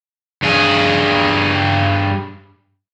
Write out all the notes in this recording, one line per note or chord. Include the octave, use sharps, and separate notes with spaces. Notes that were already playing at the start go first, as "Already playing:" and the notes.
G2 G#4